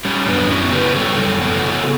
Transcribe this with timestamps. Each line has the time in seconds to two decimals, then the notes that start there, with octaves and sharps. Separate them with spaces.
0.05 G3 C#4
0.28 F#2 B3 D4
0.51 B3 C#4 E4
0.73 C#3 G4 B4
0.96 G3 A4 C#5
1.19 F#2
1.41 B3 A4 C#5
1.64 C#3